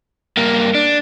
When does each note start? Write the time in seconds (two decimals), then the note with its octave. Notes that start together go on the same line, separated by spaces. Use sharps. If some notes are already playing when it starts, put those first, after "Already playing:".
0.37 G2 A#3
0.75 D4